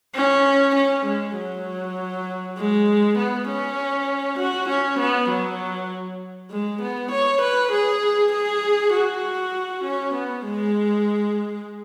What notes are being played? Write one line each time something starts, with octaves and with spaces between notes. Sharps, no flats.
C#4
C#4
G#3
F#3
G#3
B3
C#4
F#4
C#4
B3
F#3
G#3
B3
C#5
B4
G#4
G#4
F#4
C#4
B3
G#3